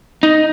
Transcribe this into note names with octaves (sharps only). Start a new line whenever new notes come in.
D#4